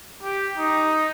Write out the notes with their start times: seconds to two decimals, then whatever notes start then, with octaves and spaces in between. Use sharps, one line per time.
0.23 G4
0.58 D#4